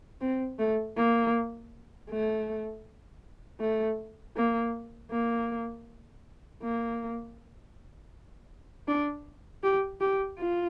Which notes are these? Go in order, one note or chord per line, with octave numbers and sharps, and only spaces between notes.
C4
A3
A#3
A3
A3
A#3
A#3
A#3
D4
G4
G4
F4